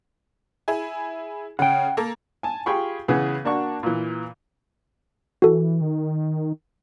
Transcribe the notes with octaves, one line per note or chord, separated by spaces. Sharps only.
E4 G#4 G#5
C#3 F#5 G5
A#3 A4 A#5
G#5 A5
F4 G4 G#4 G5 B5 C#6
C#3 E3 B3 G#4 B4
A#3 D4 F#4 C#6
A#2 E3
E3 F#4 A4
D#3